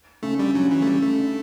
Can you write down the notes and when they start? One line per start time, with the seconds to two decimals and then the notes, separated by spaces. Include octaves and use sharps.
0.23 C#3 A3
0.39 D3 G3
0.55 C#3 F#3
0.71 E3
0.82 A3
0.87 G3
1.02 A3
1.19 D3